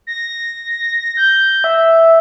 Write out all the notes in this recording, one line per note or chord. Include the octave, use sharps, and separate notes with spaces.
A#6
G6
E5